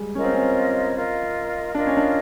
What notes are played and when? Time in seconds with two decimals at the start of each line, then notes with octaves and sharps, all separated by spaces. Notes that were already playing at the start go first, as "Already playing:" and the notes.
Already playing: G3 G#3
0.15 C#4 F4 A#4 D#5
0.24 C4
0.33 C#4
0.95 F4 A#4 D#5
1.74 D4 F4 A#4 D#5
1.87 C#4
1.97 D4